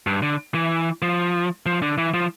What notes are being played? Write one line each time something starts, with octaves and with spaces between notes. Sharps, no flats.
G2
D3
E3
F3
F3
D3
E3
F3